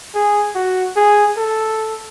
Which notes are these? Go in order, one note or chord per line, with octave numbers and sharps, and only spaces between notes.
G#4
F#4
G#4
A4